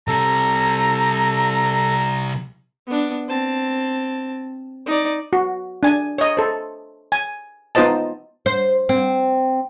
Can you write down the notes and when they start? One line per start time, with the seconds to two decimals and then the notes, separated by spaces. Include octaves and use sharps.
0.08 C3 G3 A4 A#5
2.87 B3 D4
3.28 C4 A5
4.86 D#4 D5
5.33 F#4
5.83 D4 G#5
6.18 C#5 D#5
6.37 A4 C5
7.12 G#5
7.75 B3 D#4 F4 C5 D#5 A5
8.46 C5
8.89 C4